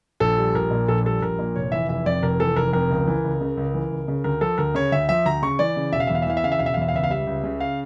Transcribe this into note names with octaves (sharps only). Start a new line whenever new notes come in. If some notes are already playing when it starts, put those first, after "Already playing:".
A#1 A4
G3
A#1 A#4
A#2
A#1 A4
G3 A4
A#1 A#4
A#2
F1 C#5
E3 E5
F1 E5
F2 D5
F1 A#4
E3 A4
F1 A#4
F2 A#4
C#2
E3
C#2
C#3
C#2
E3
C#2
C#3
D2 A#4
F3 A4
D2 A#4
C#3 C#5
D2 E5
F3 E5
D2 A#5
C#3 C#6
E3 D5
C#3
E1 E5
F5
E2 E5
F5
E5
E3 F5
E5
C#3 F5
E5
E1 F5
E5
F5
E2 E5
F5
C#2 E5
F5
G3 E5
C#2
C#3
F5